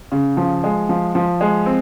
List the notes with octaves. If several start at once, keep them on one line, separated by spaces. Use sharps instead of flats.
C#3
F3
G#3
F3
F3
G#3
C4